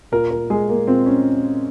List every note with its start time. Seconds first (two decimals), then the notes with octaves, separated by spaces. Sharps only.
0.12 A#2 A#4
0.31 A#4
0.50 G#3 G#4
0.69 A#3
0.87 A#2 C4
1.06 C#4